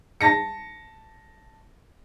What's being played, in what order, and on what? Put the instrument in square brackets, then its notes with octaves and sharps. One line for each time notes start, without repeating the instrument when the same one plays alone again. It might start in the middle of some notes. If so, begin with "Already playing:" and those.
[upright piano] A5 A#6 C#7